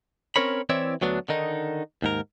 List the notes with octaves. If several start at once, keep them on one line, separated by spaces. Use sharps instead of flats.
C4 C#4 A#4 C#5 B5
E3 C4 E4 C#5 D5 E5
D2 F#3 B3 D4
D3 D#3 D#4
D#2 G#2 A#4